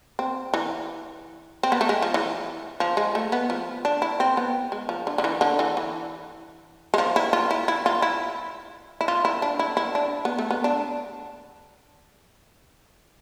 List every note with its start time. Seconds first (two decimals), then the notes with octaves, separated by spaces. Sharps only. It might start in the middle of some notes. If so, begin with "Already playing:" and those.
0.19 C4
0.54 E3
1.63 C4
1.72 B3
1.81 A3
1.89 G#3
2.02 F3
2.14 E3
2.80 F3
2.97 G#3
3.15 A3
3.32 B3
3.50 F3
3.85 D4
4.02 E4
4.20 C4
4.37 B3
4.72 G#3
4.89 F3
5.07 D3
5.18 D3
5.24 E3
5.41 D3
5.59 E3
5.77 E3
6.94 G#3
6.98 F3
7.16 E4
7.33 F4
7.51 E4
7.68 E4
7.86 F4
8.02 E4
9.01 E4
9.08 F4
9.25 E4
9.42 D4
9.59 E4
9.77 E4
9.95 D4
10.25 B3
10.38 A3
10.51 B3
10.64 D4